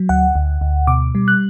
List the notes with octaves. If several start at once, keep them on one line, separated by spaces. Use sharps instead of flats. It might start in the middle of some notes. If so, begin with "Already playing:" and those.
Already playing: F#3
D2 F#5
D2
D2
B2 D6
G3
F#6